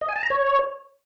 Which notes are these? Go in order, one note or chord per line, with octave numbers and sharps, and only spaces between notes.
D#5
G#5
A5
A#5
C#5